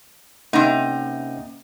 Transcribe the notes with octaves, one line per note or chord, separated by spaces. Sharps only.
C3 A#3 C#4 D#4 F#5